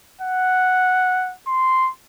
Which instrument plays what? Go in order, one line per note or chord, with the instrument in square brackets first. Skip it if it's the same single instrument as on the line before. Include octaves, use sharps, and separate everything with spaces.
[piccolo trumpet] F#5
C6